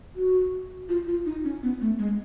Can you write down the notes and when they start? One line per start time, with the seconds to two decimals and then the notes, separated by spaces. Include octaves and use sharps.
0.16 F#4
0.89 F4
1.07 F4
1.26 D#4
1.44 C#4
1.63 B3
1.81 A3
1.99 G#3